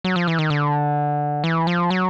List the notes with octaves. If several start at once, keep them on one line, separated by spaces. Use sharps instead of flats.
F#3
F3
E3
D#3
D3
E3
F3
F#3